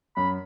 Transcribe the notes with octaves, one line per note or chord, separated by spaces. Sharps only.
F#2 B5